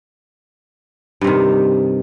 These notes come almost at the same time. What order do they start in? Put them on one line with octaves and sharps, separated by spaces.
G2 C3 D#3